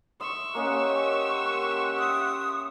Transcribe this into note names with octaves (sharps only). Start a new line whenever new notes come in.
E5 C6 C#6 D#6 E6
A#3 C#4 G4 D#5 F#5 C6
E5 D#6